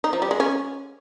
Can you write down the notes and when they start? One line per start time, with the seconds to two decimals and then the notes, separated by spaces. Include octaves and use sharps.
0.04 D#4
0.13 F3
0.22 G3
0.31 G#3
0.40 C#4